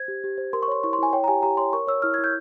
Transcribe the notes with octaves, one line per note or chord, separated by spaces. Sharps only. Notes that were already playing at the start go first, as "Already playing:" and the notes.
Already playing: C5 G#6
G4
G4
C5
A#4 C6
C#6
C#5 C6
E4 C#6
C6
E4 G#5
C#5 G5
A#5
G4 G#5
G4 A#5
C#5 C6
A#4 C#6
C#5 E6
E4 F6
G#6
E4
G6